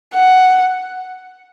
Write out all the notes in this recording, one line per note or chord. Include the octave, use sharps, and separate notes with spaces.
F#5